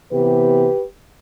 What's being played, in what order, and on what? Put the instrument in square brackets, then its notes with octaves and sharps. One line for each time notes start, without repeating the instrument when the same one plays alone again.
[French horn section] C3 E3 B3 G4 B4